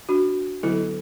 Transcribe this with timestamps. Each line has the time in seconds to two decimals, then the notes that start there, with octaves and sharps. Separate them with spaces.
0.09 D4 F#4
0.63 D3 F#3 B3 E4 A4